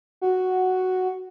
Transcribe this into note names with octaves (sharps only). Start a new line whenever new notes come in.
F#4